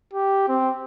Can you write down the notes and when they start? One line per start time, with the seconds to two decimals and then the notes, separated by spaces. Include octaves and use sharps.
0.13 G4
0.48 C4